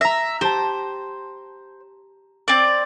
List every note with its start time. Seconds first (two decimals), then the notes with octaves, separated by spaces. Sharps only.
0.01 E5 A#5 A#6
0.41 G4 C5 A5
2.48 C4 D5 A6